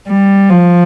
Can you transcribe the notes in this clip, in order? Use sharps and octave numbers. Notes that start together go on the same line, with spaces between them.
G3
F3